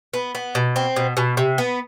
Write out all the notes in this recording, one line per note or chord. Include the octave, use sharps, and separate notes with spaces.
B3
B3
B2
C4
B2
B2
C3
B3